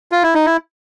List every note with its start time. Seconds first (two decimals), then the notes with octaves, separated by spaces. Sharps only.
0.12 F4
0.23 E4
0.35 D#4
0.46 E4